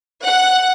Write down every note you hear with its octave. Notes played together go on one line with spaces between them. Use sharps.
F#5